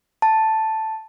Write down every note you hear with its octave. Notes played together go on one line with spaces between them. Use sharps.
A5